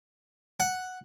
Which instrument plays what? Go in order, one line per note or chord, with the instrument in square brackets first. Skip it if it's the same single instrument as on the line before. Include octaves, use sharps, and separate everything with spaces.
[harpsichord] F#5